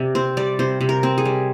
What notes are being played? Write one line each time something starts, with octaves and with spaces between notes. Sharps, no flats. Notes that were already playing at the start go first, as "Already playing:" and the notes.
Already playing: C3 D5
C4 C5
G3 D5
C3 C5
C3
A#4
C4
G#4
G3